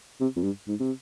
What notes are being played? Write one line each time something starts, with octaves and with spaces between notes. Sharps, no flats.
C3
F2
G2
G#2
C3